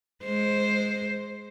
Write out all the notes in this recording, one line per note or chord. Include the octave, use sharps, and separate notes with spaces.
G#3 C5